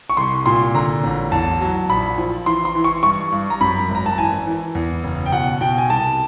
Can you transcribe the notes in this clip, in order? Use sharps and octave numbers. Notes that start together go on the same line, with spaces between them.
C#6
C2 C6
A#2 C6
D3 A#5
A1
E2 A5
F#3
A#1 B5
F3
E3 C6
C6
E3
C#6
G2 C#6
G2
A#5
F#2 B5
G#1
A#5
A5
E3 G#5
E3
E2
F#1
G5
B2 F#5
B2 G5
G#5
C2 A5